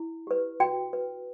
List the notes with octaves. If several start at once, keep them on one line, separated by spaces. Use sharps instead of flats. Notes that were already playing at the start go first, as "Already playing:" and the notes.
Already playing: E4
G4 B4
F#4 G5
B4